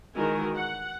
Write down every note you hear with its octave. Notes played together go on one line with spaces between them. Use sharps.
D#3 E3 G#3 F#4 A#4 G#5
F#5